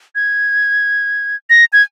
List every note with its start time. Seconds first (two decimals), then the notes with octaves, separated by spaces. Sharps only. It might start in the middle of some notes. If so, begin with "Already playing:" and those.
0.15 G#6
1.50 A#6
1.73 G#6